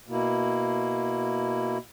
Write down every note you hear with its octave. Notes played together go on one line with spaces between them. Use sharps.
B2 A#3 E4